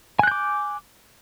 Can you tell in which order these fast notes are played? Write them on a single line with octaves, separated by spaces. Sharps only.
G#5 F#6 G6 D6